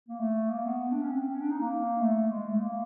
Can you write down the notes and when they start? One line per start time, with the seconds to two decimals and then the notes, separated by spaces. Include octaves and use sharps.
0.08 A#3
0.19 A3
0.50 A#3
0.65 B3
0.92 D4
1.01 C#4
1.10 C4
1.31 C#4
1.40 D4
1.50 D#4
1.60 A#3
2.01 A3
2.31 G#3
2.47 A3
2.61 A#3